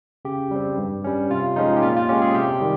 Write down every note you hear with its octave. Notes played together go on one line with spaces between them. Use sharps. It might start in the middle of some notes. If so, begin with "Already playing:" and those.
C#3 G4
G3 C4
G2
G3 C#4
C3 F4
F3 G#3 C#4 D#4
G4
A#2 F4
F4
G#3 C#4 G4
G#4
C3 G4
D#3 G3